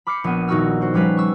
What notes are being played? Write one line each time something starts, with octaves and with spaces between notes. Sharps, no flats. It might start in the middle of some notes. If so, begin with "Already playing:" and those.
B5 D6 F6 G6 C7 C#7
A#1 B3 D#7
D#1 D#4 F#4 C#6 E6 F6
F#4 C5
F3 G3 C#4 B4 F5
C#6 E6